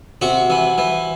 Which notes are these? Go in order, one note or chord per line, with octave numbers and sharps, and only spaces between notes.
C3 F#4
E3
E3